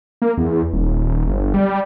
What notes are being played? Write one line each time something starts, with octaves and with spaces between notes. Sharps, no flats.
A#3
E2
D#1
G1
G3